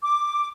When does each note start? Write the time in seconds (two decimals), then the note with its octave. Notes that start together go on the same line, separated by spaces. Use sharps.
0.03 D6